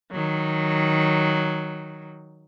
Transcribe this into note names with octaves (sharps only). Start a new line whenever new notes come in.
D#3 F#3